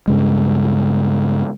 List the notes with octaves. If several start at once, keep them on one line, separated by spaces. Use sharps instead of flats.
G2 C#3 G#3